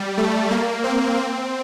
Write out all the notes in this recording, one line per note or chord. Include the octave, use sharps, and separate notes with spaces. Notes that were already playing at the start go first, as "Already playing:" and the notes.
Already playing: G3
A3
A#3
C4
C4